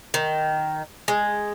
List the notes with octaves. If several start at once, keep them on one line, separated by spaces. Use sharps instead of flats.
D#3
G#3